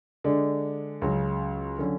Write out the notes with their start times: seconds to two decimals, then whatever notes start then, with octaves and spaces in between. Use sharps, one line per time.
0.24 D3 G#3 D4
1.02 C#2 C#3 F#3
1.79 D3 F#3 C#4